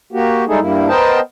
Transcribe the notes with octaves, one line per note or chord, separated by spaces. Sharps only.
A#3 F#4 G4
G3 G#3 D#4 E4 G#4 A4
G2 G3 A#3 E4
B3 A#4 C5 D#5 G5 A5